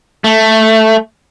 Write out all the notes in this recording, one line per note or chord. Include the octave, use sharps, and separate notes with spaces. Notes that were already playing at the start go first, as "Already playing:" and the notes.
A3